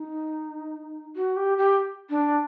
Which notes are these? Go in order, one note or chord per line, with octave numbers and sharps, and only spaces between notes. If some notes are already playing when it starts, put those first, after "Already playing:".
Already playing: D#4
F#4
G4
G4
D4